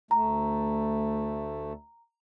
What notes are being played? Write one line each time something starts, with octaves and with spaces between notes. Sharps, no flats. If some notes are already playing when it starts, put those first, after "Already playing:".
D2 A3 A#5